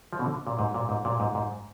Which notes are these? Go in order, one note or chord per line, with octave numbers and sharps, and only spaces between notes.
F3
B2
D3
A#2
G#2
A#2
G#2
A#2
G#2
G#2